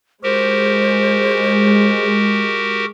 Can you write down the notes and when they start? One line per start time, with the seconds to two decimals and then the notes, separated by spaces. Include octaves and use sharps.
0.23 G#3 F#4 G4 A#4 C5